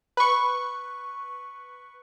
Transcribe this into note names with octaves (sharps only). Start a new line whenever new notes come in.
B4 C#6